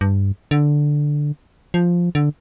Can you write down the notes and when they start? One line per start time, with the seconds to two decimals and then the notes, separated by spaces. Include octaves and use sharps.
0.01 G2
0.51 D3
1.74 F3
2.15 D3